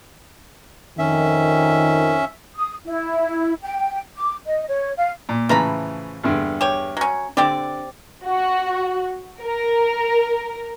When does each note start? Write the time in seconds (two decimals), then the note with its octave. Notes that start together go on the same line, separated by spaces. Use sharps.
0.99 F2 D#3 C#4 E5
2.57 D#6
2.86 E4
3.62 G5
4.15 D6
4.45 D#5
4.68 C#5
4.97 F5
5.29 A#2
5.49 A2 C#3 E3 F3 A#5 B5
6.24 E2 G2 D3
6.61 G4 C#5
6.97 F#3 C#4
7.37 D3 C4 G4 D5
8.25 F#4
9.42 A#4